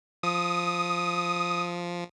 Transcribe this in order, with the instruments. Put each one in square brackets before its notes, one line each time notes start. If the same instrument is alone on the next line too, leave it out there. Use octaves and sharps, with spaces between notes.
[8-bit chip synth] F3 [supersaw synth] D#6